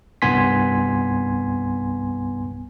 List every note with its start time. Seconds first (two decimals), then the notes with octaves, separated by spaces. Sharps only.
0.22 C2 G2 B3 G#5 C6 B6